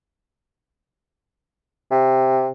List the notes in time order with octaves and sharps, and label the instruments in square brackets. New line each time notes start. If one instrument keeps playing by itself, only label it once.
[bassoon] C3